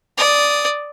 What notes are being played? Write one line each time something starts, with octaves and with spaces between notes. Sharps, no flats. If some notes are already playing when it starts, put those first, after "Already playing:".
D5 D#6